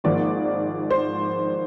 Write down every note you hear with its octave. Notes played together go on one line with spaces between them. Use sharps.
G#1 G#2 F3 A#3 D5
C5